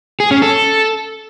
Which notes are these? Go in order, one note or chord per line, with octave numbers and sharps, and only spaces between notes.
G#4
C#4
A4